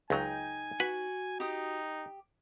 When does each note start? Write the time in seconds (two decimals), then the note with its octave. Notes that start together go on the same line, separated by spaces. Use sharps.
0.10 C#2 F#3 D#4 G5 G#5
0.80 F#4 B4
1.40 D#4 G4 D#6